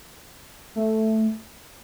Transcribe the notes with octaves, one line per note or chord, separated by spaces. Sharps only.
A3